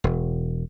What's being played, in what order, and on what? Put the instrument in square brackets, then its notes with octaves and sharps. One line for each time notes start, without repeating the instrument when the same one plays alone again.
[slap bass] E1